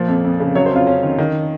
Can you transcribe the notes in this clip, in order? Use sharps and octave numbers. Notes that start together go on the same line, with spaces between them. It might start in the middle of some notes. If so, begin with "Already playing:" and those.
Already playing: A#2 F3
F2
F2
C#3
F#3 C#5
C5
F2 F4
F2 C#4
D#3
D#3